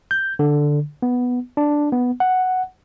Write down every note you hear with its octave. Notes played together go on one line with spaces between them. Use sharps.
G6
D3
B3
D4
B3
F#5